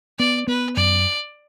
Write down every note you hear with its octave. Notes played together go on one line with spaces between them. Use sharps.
B3 D5
B3 B4
F#2 D5